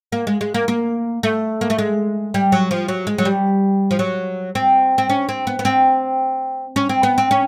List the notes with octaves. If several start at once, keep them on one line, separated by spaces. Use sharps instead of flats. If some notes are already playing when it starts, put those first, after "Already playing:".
A#3
G#3
G#3
A#3
A#3
A3
A#3
A3
G#3
G3
F#3
F3
F#3
G#3
F#3
G3
F3
F#3
C4
C4
C#4
C4
B3
B3
C4
C#4
C4
B3
C4
C#4